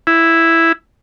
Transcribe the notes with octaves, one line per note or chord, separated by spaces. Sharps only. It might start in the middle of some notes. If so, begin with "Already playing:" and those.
E4